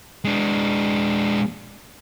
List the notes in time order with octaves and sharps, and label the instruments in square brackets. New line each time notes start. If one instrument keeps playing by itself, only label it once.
[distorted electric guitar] G#3 D4